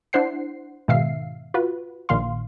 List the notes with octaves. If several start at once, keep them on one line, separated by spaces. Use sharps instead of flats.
D4 E4 C5 F#5 C7
G#2 B2 D#3 E5 F5 C7
F4 F#4 B4
A#1 A#2 D#3 F5 C6